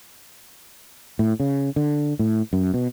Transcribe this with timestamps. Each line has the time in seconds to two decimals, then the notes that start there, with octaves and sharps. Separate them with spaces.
1.19 A2
1.40 C#3
1.76 D3
2.19 A2
2.53 F#2
2.74 B2